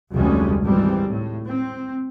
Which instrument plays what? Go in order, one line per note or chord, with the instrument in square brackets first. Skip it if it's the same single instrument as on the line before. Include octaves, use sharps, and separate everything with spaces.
[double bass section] F1 D2 G3 G#3 C#4
G#1 E3 G3 C4
A2
C4